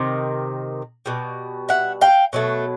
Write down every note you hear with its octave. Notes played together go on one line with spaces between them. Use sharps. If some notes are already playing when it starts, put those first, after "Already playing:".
Already playing: C3 D#3
B2 G3
E5 F#5
F5 G5
B2 F#3 A3